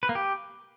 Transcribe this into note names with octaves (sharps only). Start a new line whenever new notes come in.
B4
A#3
G4